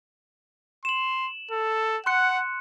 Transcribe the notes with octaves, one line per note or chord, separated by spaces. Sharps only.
C6 E7 F#7
A4
F#5 C6 F#6 C#7